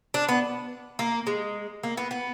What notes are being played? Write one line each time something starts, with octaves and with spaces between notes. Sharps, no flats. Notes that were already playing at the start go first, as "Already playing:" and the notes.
D4
B3
A#3
G#3
A#3
B3
B3